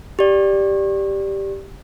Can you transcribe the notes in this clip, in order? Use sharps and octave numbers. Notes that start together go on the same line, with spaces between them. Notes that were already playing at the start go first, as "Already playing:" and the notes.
G4 D5